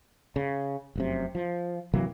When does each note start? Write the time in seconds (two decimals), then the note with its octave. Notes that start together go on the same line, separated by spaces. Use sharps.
0.36 C#3
0.96 F1 F#2 C3
1.35 F3
1.94 C3 E3 F#3 A#3